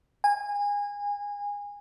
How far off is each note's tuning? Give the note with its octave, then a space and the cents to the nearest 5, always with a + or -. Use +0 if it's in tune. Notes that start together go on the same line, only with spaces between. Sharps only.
G#5 -25